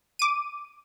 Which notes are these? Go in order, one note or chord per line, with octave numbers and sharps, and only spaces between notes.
D6 D#7